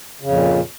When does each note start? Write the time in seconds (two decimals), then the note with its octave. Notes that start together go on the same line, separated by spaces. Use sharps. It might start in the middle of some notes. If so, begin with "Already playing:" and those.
0.21 C#3
0.26 F2
0.30 A#2